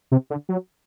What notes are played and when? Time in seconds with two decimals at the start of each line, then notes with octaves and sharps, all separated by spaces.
0.12 C3
0.30 D3
0.49 F#3